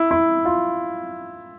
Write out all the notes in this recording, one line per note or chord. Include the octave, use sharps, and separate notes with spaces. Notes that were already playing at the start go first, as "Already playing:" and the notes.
Already playing: E4
E4
F4